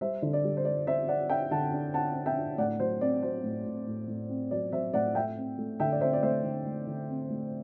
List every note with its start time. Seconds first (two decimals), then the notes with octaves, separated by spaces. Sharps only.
0.01 G3 C5 E5
0.22 D3
0.33 D5
0.44 G3
0.57 C5
0.65 G3 D5
0.87 D3 C5 E5
1.08 D4 D5 F#5
1.29 D4 E5 G5
1.51 D3 F#5 A5
1.73 D4
1.94 D4 F#5 A5
2.15 D4
2.26 E5 G5
2.37 D4
2.58 A2 D5 F#5
2.80 F#3 C5
3.01 C4 D5
3.23 F#3 C5
3.44 A2
3.65 A2
3.87 A2
4.08 A2
4.29 C4
4.51 F#3 D5
4.72 F#3 C5 E5
4.93 A2 D5 F#5
5.15 A3 E5 G5
5.37 C4
5.58 A3
5.80 D3 E5 G5
5.92 D5
6.01 C4 C5 E5
6.13 D5
6.22 A3 C5 E5
6.43 D3
6.65 A3
6.87 D3
7.08 C4
7.30 A3